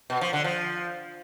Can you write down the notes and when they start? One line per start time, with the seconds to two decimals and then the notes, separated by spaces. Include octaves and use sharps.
0.10 B2
0.21 F3
0.33 D3
0.44 F3